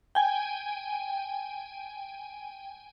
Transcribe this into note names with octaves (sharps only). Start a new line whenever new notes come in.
G5 G#5